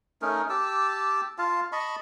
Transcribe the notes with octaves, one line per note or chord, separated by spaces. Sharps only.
A3 C#4 D#4 A#4
G4 A5 D6 E6
F4 F5 A5
D#5 A5 B5 C#6